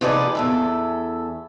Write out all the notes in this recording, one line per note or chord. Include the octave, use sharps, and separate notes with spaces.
C3 F3 D#4 G#4 B4 D5
E2 A4 E5